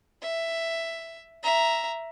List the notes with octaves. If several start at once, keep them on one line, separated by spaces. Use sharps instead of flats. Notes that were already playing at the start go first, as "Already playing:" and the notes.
E5
E5 A#5